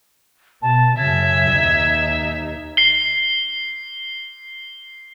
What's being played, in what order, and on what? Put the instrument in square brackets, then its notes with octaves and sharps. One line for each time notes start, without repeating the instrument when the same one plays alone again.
[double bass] B2 [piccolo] A5
[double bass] F#2 C#3 [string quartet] E5 [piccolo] G#6
[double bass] D#2 D#4
[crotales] C7 G7